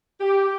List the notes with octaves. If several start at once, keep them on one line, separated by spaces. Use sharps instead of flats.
G4